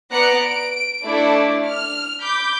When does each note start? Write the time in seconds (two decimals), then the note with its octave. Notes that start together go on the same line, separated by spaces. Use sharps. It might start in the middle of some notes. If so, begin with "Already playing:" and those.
0.11 B3 D5 A#5 F#6 C#7
0.42 D7
1.04 A3 D4 E4 D5
1.69 F6
2.21 B5 D6 G6